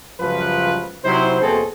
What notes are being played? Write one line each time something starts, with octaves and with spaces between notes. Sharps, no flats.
C#2 F#2 F3 G3 F4 B4
C3 F#3 D#4 E4 C5
E2 B2 A#3 C4 G#4 A4